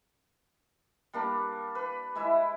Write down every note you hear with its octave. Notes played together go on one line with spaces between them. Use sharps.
G3 A#3 D4
B4
G#3 E4 E5